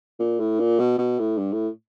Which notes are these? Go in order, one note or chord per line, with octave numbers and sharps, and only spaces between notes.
A#2
A2
A#2
B2
B2
A2
G2
A2